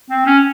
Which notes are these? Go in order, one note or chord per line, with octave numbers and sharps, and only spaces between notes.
C4
C#4